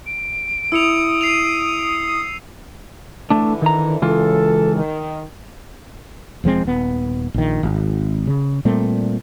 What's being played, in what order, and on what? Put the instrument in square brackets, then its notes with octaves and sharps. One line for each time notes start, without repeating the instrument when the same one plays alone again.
[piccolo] D7
[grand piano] E4 [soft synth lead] D#6 [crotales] E6 C#7 F7
[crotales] C7 D#7 F7
[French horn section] D3 E3 [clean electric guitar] A3 D4
[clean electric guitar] D#3 A#5
[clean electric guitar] C#2 E3 F4 [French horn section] F#2 A4
[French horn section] D#3
[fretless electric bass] E1 F3 G#3 C4
D#1 B3
A#1 D#3
G#1
C#3
A#2 G3 A3 C4